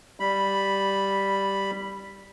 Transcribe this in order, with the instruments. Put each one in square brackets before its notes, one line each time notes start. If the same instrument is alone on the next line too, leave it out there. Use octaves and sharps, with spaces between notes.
[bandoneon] G3 B5